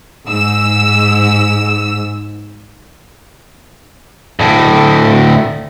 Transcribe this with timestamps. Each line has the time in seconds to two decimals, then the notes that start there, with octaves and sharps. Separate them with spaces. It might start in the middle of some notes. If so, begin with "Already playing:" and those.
0.29 G#2 E6
4.39 D2 A2